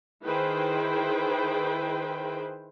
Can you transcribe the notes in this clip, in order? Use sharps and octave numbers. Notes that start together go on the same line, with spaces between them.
D#3 E4 G#4 B4 C5 G5